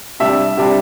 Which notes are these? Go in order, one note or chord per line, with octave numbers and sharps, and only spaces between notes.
C3 G3 D4 E5
C3 G3 D4